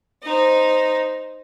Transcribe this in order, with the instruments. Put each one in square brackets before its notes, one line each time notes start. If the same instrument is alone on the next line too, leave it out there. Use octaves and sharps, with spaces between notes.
[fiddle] D#4 C5